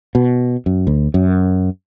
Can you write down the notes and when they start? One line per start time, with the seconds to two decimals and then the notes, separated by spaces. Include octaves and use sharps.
0.15 B2
0.66 F#2
0.87 D2
1.14 F#2